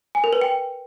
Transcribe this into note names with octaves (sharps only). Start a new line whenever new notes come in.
G#5
A#4
B4
G5